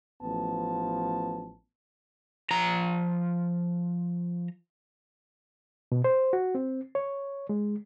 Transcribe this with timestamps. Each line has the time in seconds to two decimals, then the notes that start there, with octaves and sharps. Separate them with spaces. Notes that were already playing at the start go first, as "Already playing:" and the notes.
0.22 A1 F3 B3 A5
2.51 F3 A#5
5.92 B2
6.04 C5
6.33 F#4
6.55 C4
6.95 C#5
7.49 G#3